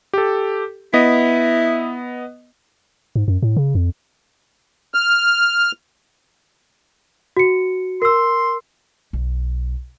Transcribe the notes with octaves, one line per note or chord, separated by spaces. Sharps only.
G4 A4
B3 E4 D#5
G#2
F#2
A2
C#3
F2
F6
F#4 C#7
A#4 C6 E6
B1